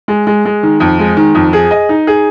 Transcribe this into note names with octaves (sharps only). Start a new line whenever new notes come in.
G#3
G#3
G#3
D#3
F2
G#3
D#3
F2
G#4
D#5
D#4
G#4